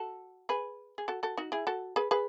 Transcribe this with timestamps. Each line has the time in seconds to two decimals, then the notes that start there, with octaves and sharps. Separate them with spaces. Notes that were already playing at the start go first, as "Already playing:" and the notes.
Already playing: F#4 A4
0.49 G#4 B4
0.98 G#4
1.08 F#4 A4
1.23 F#4 A4
1.37 D#4 F#4
1.52 E4 G#4
1.67 F#4 A4
1.96 G#4 B4
2.11 G#4 B4